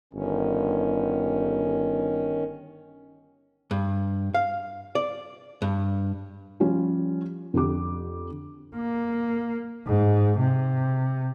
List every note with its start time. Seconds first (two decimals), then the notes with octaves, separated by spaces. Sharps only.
0.13 G1 D#3 C#4
3.71 G2
4.34 F5
4.95 D5
5.62 G2
6.60 F3 G3 C#4
7.54 F2 D3 G4 D6
8.75 A#3
9.86 G#2
10.39 C3